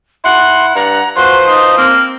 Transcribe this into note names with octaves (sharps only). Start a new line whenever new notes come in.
E4 F#5 C6
G2 F#5 A#5
F3 F#4 B4 C5 C6
D#4
A#3 C4